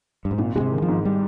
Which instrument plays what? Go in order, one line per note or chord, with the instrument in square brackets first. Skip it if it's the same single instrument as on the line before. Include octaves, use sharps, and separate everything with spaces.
[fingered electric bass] G2
G#2
[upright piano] G#1 [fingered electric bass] A#2
[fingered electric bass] A#2 [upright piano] G#3
[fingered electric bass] C3
[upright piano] D#3
[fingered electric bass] F3
[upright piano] G#2
[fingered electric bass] G3